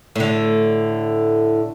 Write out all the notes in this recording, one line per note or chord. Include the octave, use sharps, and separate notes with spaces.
A2 D3